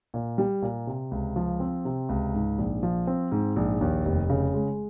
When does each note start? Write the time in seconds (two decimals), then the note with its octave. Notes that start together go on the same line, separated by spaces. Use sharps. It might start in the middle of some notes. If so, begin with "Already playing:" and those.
0.14 A#2
0.38 G3
0.62 A#2
0.87 C3
1.11 C#2
1.36 F3
1.60 C4
1.85 C3
2.09 C#2
2.34 G#2
2.58 A#1
2.83 F3
3.07 C4
3.32 G#2
3.56 A#1
3.81 D#2
4.05 F1
4.30 C#3
4.54 G#3